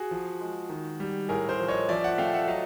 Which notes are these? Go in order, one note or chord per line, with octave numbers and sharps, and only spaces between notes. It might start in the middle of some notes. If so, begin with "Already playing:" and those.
Already playing: F#4 G#4
F3
G#3
D#3
G3
A2 G#4 A#4
A#4 C5
F3
C#5 D#5
F3 D5 E5
E5 F#5
A3 F5 G5
E5 F#5
F#3 D#5 F5